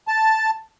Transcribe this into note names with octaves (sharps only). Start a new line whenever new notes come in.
A5